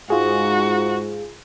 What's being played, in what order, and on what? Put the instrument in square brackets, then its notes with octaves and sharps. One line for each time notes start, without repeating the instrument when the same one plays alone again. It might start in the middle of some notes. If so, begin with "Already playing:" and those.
[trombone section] G#2 [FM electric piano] F4 G#4 [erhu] F#4